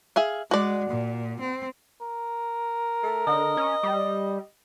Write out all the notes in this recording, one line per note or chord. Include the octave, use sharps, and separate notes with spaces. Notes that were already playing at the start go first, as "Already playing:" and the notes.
G#4 E5 F5
G#3 F#4 D5
A#2
C4
A#4
A3
D3 D#5
C#4
G3